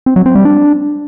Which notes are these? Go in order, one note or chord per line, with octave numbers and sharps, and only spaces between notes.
C4
F#3
C4
G3
D4